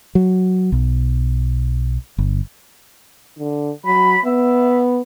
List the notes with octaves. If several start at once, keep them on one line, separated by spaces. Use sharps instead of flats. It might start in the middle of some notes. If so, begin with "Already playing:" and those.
F#3
B1
G1
D3
F#3 B5
B3 E5